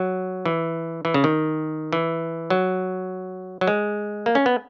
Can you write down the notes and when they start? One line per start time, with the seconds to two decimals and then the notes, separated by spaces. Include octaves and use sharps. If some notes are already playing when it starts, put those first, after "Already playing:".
Already playing: F#3
0.45 E3
1.05 E3
1.14 C#3
1.24 D#3
1.93 E3
2.50 F#3
3.61 F#3
3.68 G#3
4.26 A#3
4.35 C#4
4.46 B3